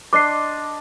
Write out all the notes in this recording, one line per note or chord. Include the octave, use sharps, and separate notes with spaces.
D4 D#5 C6 D6 C7